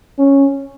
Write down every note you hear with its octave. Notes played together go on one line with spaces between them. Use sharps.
C#4